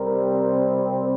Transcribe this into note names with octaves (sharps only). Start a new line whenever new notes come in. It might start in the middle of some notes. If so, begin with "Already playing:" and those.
Already playing: C2 C3 G3 C4 A#4